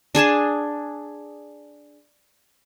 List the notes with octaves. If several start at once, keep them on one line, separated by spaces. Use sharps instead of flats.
D4 G#4 G#5 A5